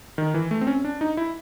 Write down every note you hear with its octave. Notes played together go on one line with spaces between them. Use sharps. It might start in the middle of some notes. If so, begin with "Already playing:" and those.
D#3
E3
A3
C4
C#4
D4
D#4
E4